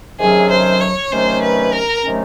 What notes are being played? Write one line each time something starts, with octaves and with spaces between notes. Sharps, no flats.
C3 D#3 F#3 A3 C#4 G#4
C5
C#5
C3 D#3 F#3 A3 C#4 C5
B4
A#4
C3 D#3 F#3 A3 C#4